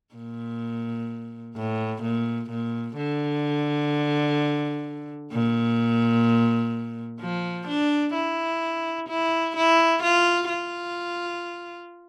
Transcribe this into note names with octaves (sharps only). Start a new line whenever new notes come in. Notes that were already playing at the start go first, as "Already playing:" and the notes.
A#2
A2
A#2
A#2
D3
A#2
F3
D4
E4
E4
E4
F4
F4